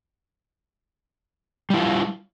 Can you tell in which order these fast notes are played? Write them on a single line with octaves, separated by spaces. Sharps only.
G3 E4 F4